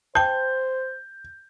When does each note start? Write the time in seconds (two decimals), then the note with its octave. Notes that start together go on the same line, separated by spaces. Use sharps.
0.15 C5 G5 A5 G6